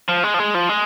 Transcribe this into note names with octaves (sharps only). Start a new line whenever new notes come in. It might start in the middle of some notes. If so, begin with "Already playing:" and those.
F3
G#3
F3
G#3
F3
G#3